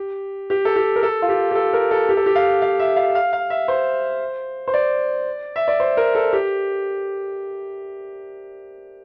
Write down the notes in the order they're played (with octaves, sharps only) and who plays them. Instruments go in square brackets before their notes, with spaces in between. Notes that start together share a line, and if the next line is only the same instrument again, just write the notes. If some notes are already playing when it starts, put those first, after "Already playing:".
Already playing: [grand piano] G4
G4
A4
G4
A#4
A4
F4
G4
G4
A4
A#4
A4
G4
A4
G4
F5
F5
E5
F5
F5
F5
E5
C5
C5
D5
E5
D5
C5
A#4
A4
G4